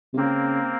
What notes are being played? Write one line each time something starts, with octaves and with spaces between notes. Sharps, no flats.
C3
C#3 A#3 C4